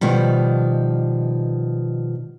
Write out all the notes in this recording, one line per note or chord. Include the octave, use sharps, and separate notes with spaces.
B2 D#3 F3 G3